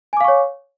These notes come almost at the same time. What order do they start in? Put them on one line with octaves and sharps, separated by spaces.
G#5 D6 F5 C#6 C#5